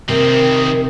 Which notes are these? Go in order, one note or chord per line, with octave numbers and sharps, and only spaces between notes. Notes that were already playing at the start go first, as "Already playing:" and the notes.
C3 D#3 C4 A#4